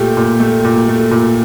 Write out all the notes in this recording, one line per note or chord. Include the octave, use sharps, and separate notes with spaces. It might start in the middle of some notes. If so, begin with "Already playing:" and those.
Already playing: A#2 A3 G4
A#2
A3
A#2
A3
A#2